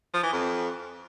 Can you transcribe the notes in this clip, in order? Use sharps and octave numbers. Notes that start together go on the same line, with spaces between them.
F3
E3
F2